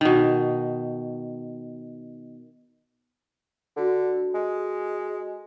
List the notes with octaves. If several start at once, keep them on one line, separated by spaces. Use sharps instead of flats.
B2 D#3
D3 F#4 A4
G#3